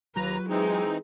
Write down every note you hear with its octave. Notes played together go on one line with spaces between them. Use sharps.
D#2 F#3 F4 G4 B4 A#5
E3 G#3 C4 D#4